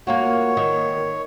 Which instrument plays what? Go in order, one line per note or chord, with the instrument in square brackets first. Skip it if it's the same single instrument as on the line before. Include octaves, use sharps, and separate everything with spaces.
[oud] A#3 F4 F#4 [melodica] C#5
[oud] D#3